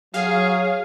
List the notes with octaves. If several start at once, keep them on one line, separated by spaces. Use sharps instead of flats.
F#3 G#4 F5